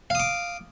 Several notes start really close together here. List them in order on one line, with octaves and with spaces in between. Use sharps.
F5 D#6 D6